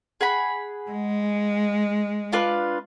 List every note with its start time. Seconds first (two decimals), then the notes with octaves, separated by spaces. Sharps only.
0.21 G#4 F#5 B5
0.90 G#3
2.32 D4 F4 B4